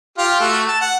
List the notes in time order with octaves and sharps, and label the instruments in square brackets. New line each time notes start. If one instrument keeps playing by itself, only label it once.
[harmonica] F4 G4 F5
A3 F#4 A4
A5
F#5